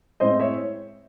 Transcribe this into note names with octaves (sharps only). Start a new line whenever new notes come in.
A2 G#3 C4 E4 C5 D#5
C#5 E5